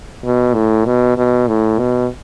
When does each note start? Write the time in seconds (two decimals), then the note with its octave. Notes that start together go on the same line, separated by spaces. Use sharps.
0.24 B2
0.54 A2
0.85 B2
1.17 B2
1.47 A2
1.79 B2